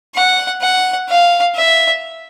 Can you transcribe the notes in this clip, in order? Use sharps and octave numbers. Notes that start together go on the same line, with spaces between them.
F#5
F#5
F5
E5